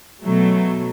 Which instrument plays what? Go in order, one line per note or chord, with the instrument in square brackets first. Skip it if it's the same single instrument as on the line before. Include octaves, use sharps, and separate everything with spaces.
[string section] B2 F#3 A3